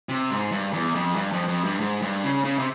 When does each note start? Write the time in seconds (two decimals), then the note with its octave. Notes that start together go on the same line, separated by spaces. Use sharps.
0.09 C3
0.30 G#2
0.52 G2
0.73 E2
0.95 F2
1.16 G2
1.32 F2
1.48 F2
1.64 G2
1.80 G#2
2.02 G2
2.24 C#3
2.44 C#3
2.59 C3